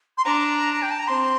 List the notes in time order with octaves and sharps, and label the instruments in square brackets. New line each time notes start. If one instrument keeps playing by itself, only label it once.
[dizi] C6
[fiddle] D4 [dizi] A#5
[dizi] G5
A5
A#5
[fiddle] C4 [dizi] C6